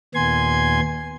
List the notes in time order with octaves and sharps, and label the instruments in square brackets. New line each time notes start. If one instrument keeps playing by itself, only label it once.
[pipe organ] D#2 A#2 B3 G#5 C6 G#6